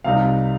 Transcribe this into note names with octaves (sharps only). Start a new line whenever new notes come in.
C2 C3 G3 D#4 F5